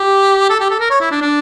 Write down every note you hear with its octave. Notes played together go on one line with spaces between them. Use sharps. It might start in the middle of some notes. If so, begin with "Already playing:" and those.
Already playing: G4
A4
G4
A4
A#4
C#5
E4
D4
D4